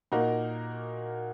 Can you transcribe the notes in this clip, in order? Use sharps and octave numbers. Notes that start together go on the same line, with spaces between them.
A#2 A#3 D#4 F#4 A#4